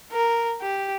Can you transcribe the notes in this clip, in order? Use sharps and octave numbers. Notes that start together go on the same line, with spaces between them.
A#4
G4